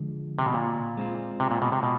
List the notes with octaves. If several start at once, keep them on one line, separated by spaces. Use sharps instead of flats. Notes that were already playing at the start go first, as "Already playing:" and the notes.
Already playing: D3 F3 G#3
C3
B2
A#2
G#3 C4 F4
C3
A#2
B2
C3
B2